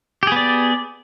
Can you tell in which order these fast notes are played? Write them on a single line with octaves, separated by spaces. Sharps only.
G4 G#4 B3 D5